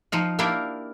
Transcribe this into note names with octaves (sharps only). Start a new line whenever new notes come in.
F3 D#4 F4
A#3 D4 E4 F4 G4 A#4